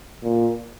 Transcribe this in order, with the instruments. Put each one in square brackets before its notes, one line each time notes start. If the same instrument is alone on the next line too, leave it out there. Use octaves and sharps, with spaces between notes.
[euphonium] A#2